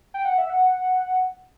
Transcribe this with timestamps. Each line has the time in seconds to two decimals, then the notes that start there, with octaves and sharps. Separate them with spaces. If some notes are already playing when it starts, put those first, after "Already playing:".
0.14 G5
0.25 F#5
0.38 E5
0.50 F#5